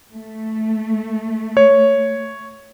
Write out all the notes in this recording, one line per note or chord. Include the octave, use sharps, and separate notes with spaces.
A3
C#5